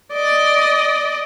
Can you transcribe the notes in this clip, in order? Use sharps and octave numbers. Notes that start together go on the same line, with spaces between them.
D5 D#5